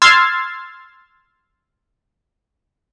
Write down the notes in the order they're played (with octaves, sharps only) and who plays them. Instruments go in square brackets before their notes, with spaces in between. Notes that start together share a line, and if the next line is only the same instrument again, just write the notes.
[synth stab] C6 E6 F6 G#6 A6 C7